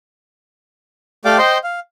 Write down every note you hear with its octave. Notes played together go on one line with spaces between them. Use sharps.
A3 G4 D5 F5 G5 D6
C5 D#5 G5 C6
F5